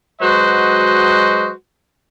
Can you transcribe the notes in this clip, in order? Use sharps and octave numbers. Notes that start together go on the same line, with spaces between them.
F#3 G#3 F#4 B4 C5 D#5